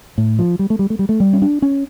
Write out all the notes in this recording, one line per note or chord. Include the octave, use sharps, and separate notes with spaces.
A2
F3
G3
A3
G3
A3
G3
A3
G3
C#4
D4
C#4